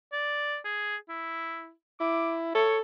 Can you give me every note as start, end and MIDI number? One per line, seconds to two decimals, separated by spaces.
0.12 0.57 74
0.64 0.96 68
1.09 1.71 64
2.00 2.54 64
2.00 2.33 86
2.55 2.81 69
2.55 2.77 73